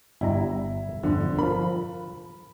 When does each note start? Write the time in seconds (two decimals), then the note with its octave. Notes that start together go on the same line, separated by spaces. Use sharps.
0.21 G1 G3 E4 A#5
1.03 G1 F2 D3
1.39 F3 A#4 B5